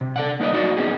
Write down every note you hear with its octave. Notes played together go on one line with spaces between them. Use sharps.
C3
A4 D5 F#5
A#3 D#4 B4 D5 D#5
F#3 A#3 D#4 F#4 D5
B3 C#4 D#4 G#4